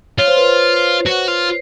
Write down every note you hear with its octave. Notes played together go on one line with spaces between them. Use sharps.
F4 C#5
C5
B4
C5
F#4
F4